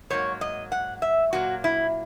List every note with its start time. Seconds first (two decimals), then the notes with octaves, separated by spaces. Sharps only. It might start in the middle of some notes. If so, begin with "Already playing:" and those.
0.10 G#2 F#3 A#3 C#5
0.41 D#5
0.72 F#5
1.02 E5
1.33 A#2 F#3 A#3 F#4
1.64 E4